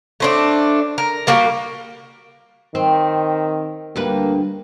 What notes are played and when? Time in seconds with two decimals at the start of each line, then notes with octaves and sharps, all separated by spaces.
0.20 A3 C4 D4
0.98 A#4
1.27 G3 A#3 F#4 G4
2.75 D#3 C4
3.96 D2 G3 A#3 B4